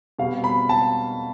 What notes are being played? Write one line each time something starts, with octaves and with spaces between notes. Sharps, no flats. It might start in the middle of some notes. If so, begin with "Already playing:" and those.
B2 G3 C4 F5
B5
A5